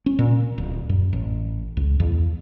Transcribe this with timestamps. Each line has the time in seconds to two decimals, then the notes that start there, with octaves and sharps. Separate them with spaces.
0.06 C#4
0.19 A#2
0.58 D1
0.89 F#2
1.13 A1
1.77 C#2
2.00 E2